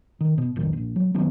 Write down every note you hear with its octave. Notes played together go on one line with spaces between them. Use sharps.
D#3
B2
F1 B1 A2 D#3
A#1
F#3
D#3 F#3 B3 C4